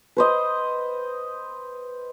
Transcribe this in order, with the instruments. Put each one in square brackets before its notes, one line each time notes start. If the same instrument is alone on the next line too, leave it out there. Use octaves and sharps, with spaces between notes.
[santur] B4 C5 D#5